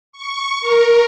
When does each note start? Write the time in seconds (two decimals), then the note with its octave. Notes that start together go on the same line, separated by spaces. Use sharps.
0.12 C#6
0.61 A#4